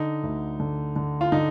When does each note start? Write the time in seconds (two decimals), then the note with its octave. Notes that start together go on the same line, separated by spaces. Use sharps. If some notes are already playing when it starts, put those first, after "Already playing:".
Already playing: D3 D#4
0.23 D2
0.60 D3
0.96 D3
1.21 F4
1.32 D3 D#4